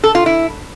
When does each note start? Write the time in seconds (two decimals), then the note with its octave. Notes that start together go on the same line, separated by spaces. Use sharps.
0.04 A4
0.15 F4
0.26 E4